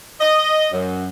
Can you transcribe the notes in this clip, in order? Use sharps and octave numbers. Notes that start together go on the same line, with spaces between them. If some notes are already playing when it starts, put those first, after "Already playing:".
D#5
F#2